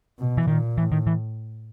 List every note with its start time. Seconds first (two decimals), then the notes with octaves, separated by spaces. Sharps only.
0.19 B2
0.38 E3
0.48 A#2 D#3
0.78 A2 E3
0.92 D#3
1.07 E3